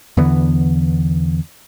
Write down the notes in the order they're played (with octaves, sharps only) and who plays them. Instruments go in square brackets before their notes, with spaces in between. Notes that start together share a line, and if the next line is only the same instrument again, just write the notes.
[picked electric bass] E2 D3 E3 B3